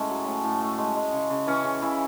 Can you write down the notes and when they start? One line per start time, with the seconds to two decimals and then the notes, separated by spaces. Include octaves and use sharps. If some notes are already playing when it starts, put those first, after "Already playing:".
Already playing: A2 G#3 C#4
0.10 F#3
0.26 A2
0.44 A2
0.60 A3
0.78 G#3
0.95 G#3
1.12 C#3
1.30 C#3
1.47 E3 C#4
1.64 C#3
1.82 C#3 E4